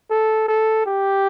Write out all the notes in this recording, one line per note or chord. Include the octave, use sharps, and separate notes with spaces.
A4
A4
G4